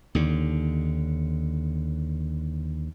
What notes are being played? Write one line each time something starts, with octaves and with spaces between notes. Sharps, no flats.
D#2 D3